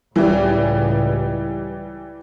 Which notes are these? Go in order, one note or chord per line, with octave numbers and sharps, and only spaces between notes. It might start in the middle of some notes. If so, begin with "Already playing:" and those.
C#2 A2 E3 G3